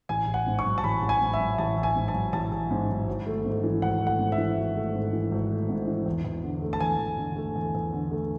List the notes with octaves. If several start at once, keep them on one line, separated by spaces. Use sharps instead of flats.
A1 G#5
A1
F#5
G#2
C#6
F#3
A5
A1 B5
A1
G#5
G#2
E5
F#3
A1 A5
A1
G#5
G#2
A5
F#3
A1 A5
A1
G#2
F#3
G#1
A3
G#2
E3
G#1 F#5
A3
F#5
G#2
E5
E3
G#1
A3
G#2
E3
G#1
A3
G#2
E3
E2
E2
D3
A3
A5
E2 G#5
E2
D3
A3
E2
E2
D3
A3